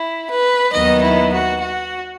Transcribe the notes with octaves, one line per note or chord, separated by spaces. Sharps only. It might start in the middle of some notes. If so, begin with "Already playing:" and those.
Already playing: E4
B4
D#2 D#3 F#3 B3 D#4 D#5
E4
F#4
F#4